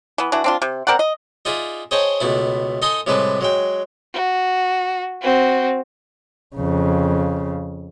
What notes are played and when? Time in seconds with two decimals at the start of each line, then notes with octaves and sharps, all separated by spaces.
0.18 E3 B3
0.32 E3 D4 F#4
0.44 C4 D4 F4
0.62 C3
0.87 C4 A#4 D5 F#5
0.99 D#5
1.45 D#4 F4 G#4 D5 E5
1.91 G#4 C5 C#5 D#5 G5 A5
2.20 C#2 B2 A3 E4
2.82 D#4 A4 D#5 G#5 C6 D#6
3.07 A2 C3 G3 G#3 B4 A5
3.41 F#3 G#3 G5
4.14 F#4
5.22 C4 F#4
6.56 F2 C#3